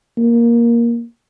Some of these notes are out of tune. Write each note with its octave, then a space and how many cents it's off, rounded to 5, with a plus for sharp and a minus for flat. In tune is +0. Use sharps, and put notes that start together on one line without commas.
A#3 +10